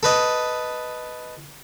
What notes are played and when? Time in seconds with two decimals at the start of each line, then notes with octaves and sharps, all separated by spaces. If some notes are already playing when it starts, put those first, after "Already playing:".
0.03 A4 B4 D#5